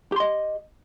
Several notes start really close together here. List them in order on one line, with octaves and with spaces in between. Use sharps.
G4 C6 D#5